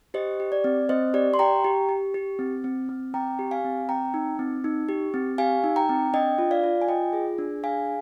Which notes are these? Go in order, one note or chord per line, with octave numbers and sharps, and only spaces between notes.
G4 C5 D#5
G4
D5
C4
C4 C5 D#5
G4 D5
C6
G4 G5 A#5
G4
G4
G4
C4
C4
C4
C4 G5 A#5
G4
F5 G#5
C4
C4 G5 A#5
D#4
C4
D#4
G4
C4
G4 F5 G#5
D#4
G5 A#5
C4
D4 D#5 G5
F4
D5 F5
F4
G#5
F4 D#5 G5
G#4
D4
G#4 F5 G#5